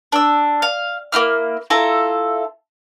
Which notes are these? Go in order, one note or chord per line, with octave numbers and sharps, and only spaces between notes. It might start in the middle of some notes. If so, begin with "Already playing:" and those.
D4 E6
F5
A#3 C4 E4 F6
E4 F4 A4 A#5